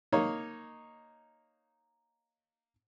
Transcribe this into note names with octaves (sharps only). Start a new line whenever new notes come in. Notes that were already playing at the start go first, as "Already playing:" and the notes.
A#3 D#4 C#5